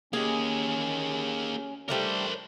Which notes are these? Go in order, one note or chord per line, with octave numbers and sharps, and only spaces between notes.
A#3 C#4 G4 G#4
G3 A3 D4 A#4 C5